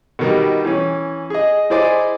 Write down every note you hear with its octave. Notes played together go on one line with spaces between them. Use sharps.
B2 D#3 G3
E3 C#4
G#4 D#5
E4 G#4 C5 D5 D#5 G#5